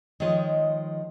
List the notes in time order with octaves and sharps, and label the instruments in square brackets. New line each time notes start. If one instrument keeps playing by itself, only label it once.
[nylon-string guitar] D#3 F3 G#3 C#5 D#5